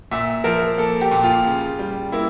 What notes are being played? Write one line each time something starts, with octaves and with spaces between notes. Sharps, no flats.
A#2 E5
F3 A#4
A#3 A4
G4
A#2
F4
C#3
G3
A#3 E4